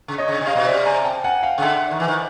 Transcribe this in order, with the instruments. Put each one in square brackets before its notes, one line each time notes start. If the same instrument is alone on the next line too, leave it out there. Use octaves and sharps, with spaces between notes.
[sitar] C#3
[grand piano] C#5 D#5
[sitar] C#3
C3
[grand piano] D#5 F5
[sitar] B2
[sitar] C3 [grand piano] D5 E5
[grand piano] G#5 A#5
G5 A5
F#5 G#5
F5 G5
[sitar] C#3
[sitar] D3 [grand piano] E5 F#5
[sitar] D#3
E3
D#3